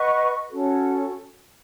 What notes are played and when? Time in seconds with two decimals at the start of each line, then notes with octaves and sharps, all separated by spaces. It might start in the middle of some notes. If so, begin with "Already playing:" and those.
Already playing: B4 D#5 F#5 C#6
0.50 C#4 F#4 A4